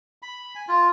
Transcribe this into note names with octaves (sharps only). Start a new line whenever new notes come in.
B5
G#5
F4